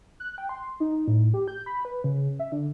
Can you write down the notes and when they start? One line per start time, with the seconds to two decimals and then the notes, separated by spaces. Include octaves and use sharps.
0.20 F#6
0.38 G5
0.49 C6
0.80 D#4
1.08 A2
1.34 G4
1.48 G6
1.66 B5
1.85 B4
2.04 C#3
2.40 E5
2.52 D3